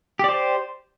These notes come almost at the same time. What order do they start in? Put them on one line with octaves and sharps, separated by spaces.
G4 D5 C5